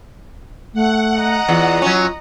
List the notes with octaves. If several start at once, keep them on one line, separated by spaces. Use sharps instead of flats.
A3 F#5
D#5 A#5
E2 F4
F#3 C#4